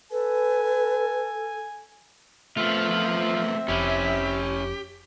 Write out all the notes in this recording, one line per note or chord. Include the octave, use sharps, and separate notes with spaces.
A4 B4 G#5
F3 A3 B3 C4 F4 E5
F1 C#4 E4 G4